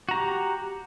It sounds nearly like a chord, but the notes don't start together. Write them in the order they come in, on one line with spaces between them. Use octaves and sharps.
F#4 A#5 G4